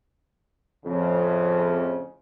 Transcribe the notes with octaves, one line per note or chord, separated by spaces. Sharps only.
F2 A2 C#3